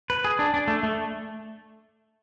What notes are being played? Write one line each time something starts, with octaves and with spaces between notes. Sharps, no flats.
B4
G#4
D4
D4
A3
A3